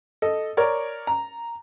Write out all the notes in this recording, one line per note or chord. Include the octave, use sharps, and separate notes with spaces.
A4 D#5
A#4 C#5 D5
A#5